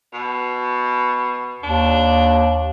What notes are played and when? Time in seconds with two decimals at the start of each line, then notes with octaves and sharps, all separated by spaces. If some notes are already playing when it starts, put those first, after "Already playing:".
0.13 B2
1.63 D#2 D4